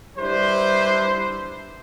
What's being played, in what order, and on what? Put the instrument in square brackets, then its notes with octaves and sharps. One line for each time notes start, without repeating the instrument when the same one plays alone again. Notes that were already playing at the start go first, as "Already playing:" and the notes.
[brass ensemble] G3 D4 E4 B4 C5